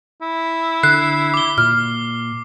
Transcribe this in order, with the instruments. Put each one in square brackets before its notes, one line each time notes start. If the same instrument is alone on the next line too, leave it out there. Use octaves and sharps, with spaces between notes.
[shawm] E4
[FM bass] D3 [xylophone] F#6 [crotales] C7
[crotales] D6 G7
[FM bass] A#2 [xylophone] F6